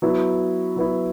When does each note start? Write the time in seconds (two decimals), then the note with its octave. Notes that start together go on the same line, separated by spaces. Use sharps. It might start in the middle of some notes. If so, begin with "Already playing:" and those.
0.02 F#3 B3 E4
0.76 F#3 B3 E4